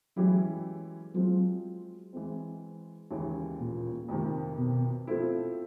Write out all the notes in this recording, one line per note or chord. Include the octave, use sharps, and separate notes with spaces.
E3 F#3 G#3 C#4 E4 G4
F3 F#3 G#3 C4
E3 G#3 C4
D#2 C#3 E3 G#3
A#2
F2 C3 D#3
B2
F3 A3 C4 E4